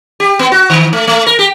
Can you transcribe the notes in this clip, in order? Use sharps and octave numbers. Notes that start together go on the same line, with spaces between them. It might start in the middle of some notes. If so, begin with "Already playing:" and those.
G4
B3
F#4
D#3
A3
A3
A#4
G4